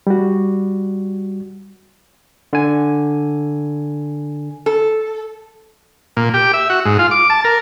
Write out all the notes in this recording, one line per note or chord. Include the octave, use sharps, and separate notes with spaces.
G3 F#4
D3 G#5
A4
A#2
G4
E5
F#4
G#2
F4
D6
A5
A#4